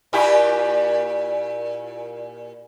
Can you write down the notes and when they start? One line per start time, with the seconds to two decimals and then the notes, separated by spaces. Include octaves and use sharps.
0.13 A#2 E4 G4